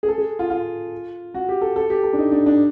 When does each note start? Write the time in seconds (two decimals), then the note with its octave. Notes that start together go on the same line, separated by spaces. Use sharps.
0.03 G#4
0.08 A4
0.18 G#4
0.39 F4
0.50 F4
1.34 F#4
1.49 G4
1.61 A4
1.76 A4
1.90 G4
2.04 A4
2.13 D4
2.18 D#4
2.32 D4
2.46 D4